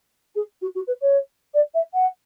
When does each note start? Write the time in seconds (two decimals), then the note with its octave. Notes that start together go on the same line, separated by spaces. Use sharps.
0.35 G#4
0.61 F#4
0.75 F#4
0.87 B4
1.01 C#5
1.54 D5
1.74 E5
1.93 F#5